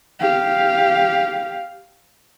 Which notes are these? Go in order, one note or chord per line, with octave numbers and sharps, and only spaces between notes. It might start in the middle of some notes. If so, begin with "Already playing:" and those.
G4 F5